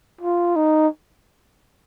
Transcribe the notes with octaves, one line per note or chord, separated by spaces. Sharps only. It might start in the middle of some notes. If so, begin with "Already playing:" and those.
F4
D#4